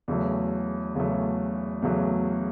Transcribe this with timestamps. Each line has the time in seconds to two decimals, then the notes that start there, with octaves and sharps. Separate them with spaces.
0.08 E2 C#3 F#3 A3
0.95 E2 C#3 F#3 A3
1.82 E2 C#3 F#3 A3